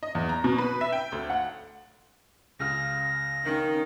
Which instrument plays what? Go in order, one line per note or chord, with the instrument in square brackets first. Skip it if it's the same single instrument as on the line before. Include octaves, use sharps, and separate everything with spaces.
[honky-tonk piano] D#5
E2
A#5
B2
B4
E5
G5
D2
F#5
[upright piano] C#2 C#3 F6 [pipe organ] A#6
[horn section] D#3 [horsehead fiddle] C#4 D#4